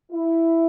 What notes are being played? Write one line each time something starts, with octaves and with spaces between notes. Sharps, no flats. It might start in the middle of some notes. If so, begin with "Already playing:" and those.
E4